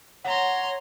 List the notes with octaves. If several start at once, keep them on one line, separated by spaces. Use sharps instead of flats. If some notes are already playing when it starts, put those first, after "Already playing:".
C#5 F#5 A#5 C6